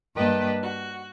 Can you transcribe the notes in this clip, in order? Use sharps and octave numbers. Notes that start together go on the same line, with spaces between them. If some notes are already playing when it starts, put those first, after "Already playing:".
G2 A#3 B4 D#5 G5 A5
F#4